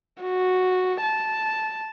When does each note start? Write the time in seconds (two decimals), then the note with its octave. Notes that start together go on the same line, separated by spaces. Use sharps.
0.23 F#4
1.02 A5